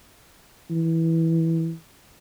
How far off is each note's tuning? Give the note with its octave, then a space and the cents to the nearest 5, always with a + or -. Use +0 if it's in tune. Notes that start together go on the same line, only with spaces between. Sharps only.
E3 -10